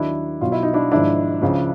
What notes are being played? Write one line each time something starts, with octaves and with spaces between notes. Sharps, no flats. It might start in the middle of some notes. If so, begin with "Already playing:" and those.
Already playing: D#2 D#3 F#3 D4 E4
B1 B2 F#3 F4
E4
D#4
D4 E4
G#1 G#2 F3 D4 E4
C#2 C#3 F3